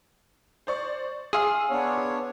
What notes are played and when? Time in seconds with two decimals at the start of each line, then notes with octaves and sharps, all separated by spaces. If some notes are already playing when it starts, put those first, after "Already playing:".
0.67 C5 D5 C#6
1.33 G#4 F5 C6 E6
1.71 B3 D4 C#5